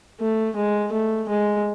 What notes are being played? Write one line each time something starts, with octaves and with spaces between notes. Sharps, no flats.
A3
G#3
A3
G#3